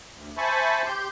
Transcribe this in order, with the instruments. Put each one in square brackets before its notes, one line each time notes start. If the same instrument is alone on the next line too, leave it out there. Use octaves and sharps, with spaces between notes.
[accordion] D2
C5 E5 G#5 A5 B5 C#6
G4 C6 G6